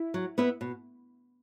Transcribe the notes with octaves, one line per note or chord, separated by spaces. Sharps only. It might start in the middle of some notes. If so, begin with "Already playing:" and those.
Already playing: E4
F#3
B3 E4 B4 E5
B2